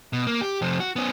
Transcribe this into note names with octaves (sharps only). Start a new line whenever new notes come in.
B2
A#3
G4
F2 C3
F#4
B3 C#4